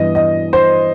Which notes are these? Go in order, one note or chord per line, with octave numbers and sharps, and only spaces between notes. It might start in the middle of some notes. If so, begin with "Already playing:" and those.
Already playing: G2 E3 B3 D#5
D#5
C5